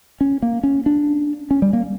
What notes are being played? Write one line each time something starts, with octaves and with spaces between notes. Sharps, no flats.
C#4
A#3
C#4
D4
C#4
G3
A#3